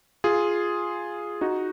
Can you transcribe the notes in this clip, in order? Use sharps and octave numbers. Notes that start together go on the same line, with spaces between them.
F4 G#4
D#4 F#4